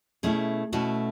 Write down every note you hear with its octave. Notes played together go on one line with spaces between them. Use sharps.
B2 A3 C#4 E4 G#4
B2 A3 C#4 E4 F#4